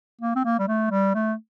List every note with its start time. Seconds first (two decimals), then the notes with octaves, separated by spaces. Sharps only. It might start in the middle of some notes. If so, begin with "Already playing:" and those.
0.21 A#3
0.36 C4
0.45 A#3
0.59 G3
0.68 A3
0.91 G3
1.14 A3